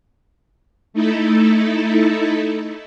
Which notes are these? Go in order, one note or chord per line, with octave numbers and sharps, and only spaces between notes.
A3 D#4 E4 A4